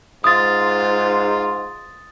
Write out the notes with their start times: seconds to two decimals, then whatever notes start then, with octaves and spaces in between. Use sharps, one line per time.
0.24 G#2 F4 D#6 A6